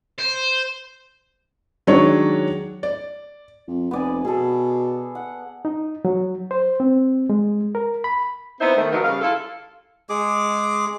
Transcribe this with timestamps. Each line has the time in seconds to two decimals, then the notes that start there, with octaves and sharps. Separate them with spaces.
0.18 C5
1.87 D#3 F#3 G#3 D4 C#5 D5
2.83 D5
3.68 F2
3.91 F1 B3 D5 G#5
4.25 B2 G#4 A4
5.15 F#5
5.65 D#4
6.05 F#3
6.51 C5
6.80 C4
7.30 G#3
7.75 A#4
8.04 B5
8.60 B3 C4 D#4 E4 C5
8.77 D#3 A3
8.92 F3 F#3 B3 D#4 A#4
9.04 C#3 G3 F5
9.21 E4 F4 A4
10.09 G#3 G#4 D6